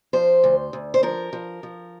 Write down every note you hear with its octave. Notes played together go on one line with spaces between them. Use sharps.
F3 C5
D2
D2
C5
F3 A#4
F3
F3